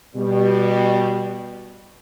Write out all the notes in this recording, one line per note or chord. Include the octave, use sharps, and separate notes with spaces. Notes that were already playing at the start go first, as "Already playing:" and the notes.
B2 G3